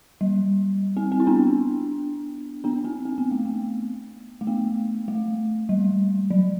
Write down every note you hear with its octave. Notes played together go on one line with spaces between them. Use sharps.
G3
C4
C4
E4
B3 D4
B3 D4
C4
C4
B3
A3
B3
A3
B3
A3
G3
F#3